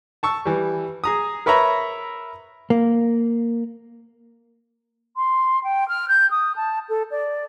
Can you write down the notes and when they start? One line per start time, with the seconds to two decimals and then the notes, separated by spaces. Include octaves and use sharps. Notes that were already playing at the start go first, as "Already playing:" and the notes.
0.23 A5 C#6 E6
0.45 E3 G3
1.04 G#4 A#5 D#6
1.46 A#4 B4 C#5 E5 A#5 B5
2.70 A#3
5.17 C6
5.63 G5
5.88 F6
6.08 G6
6.31 D#6
6.56 A5
6.89 A4
7.11 D5